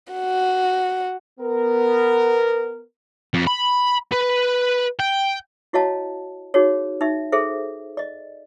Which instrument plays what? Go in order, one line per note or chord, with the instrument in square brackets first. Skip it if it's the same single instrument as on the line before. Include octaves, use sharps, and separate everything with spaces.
[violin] F#4
[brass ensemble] B3 A#4
[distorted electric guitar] F2
B5
B4
G5
[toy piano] E4 F#4 C#5 D#5 F5 A5
D#4 F#4 G#4 C#5
D#4 E5
G#4 A4 C5 E5
D5 D#5